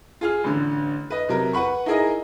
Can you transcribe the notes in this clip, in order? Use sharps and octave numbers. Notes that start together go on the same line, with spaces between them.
F4 G#4 F6
A1 D3
B4 D#5
C3 F#3 A#4
B4 F#5 B5 C#6
D#4 E4 G#4 A#4 D#5